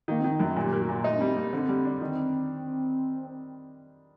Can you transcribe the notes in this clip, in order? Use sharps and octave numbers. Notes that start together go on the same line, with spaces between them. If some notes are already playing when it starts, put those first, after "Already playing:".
D#3 A#3
D#3 C4
D#4
F#2
F#4
A#2 G4
A#3
F#4
A#2
A3 D#4
D4
G3 C4
G3 A#3
D3 C4
G3
D4
D#3